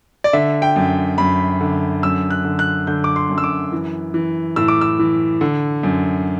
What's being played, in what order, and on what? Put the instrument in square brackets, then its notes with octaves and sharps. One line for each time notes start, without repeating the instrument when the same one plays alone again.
[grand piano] D5
D3 E5
G5
F#2
F#2 B5
D3
F#2 E6
F#6
D3
F#6
D3 G6
D6
C6
F#2
E6
D6
E3
E3
A2 E6
D6
E6
E3
D3
F#2